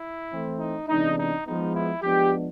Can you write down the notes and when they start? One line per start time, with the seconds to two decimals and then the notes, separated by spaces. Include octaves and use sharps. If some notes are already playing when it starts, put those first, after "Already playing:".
Already playing: E4
0.31 E3 A3 C4
0.59 D#4
0.88 C3 E3 G#3 B3 D4 D#4
1.17 D#4
1.46 F3 G#3 B3 D#4
1.75 E4
2.03 F3 G#3 B3 D4 G4